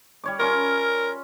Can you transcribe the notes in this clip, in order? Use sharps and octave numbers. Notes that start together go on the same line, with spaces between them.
G3 C#5 D6
C#4 F4 A#4